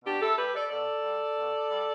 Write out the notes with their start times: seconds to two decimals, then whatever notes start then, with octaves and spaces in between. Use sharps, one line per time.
0.04 B2 D4 G4
0.21 E4 A4
0.37 G3 G4 B4
0.54 A4 D5
0.70 B2 A4 D5
1.03 G3
1.37 B2
1.70 G3